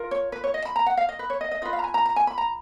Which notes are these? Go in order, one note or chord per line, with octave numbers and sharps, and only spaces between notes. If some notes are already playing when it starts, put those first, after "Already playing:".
Already playing: F4 A#4
C#5
B4
C#5
D#5
B5
A#5
F#5
F5
D#5
B4
C#5
D#5
D#5
F4 B4 D#5
F5
A#5
G#5
A#5
A#5
G#5
B5
A#5